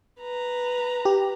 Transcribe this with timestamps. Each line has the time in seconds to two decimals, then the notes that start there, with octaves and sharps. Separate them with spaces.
0.20 B4 A#5
1.05 G4